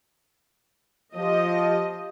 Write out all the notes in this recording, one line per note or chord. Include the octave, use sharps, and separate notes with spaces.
F3 G4 D#5